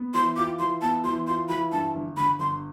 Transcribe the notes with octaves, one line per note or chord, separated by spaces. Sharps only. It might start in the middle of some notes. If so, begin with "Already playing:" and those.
Already playing: B3
E3 C6
F4 D6
E3 C6
B3 A5
E3 C6
F4 C6
E3 B5
G2 A5
G1
D3 B5
G1 C6